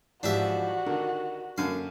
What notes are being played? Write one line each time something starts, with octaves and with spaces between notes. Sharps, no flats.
G#2 E3 F3 D4 F#4 G4 E5
D3 D#3 A#4
F#2 D3 A#3 F5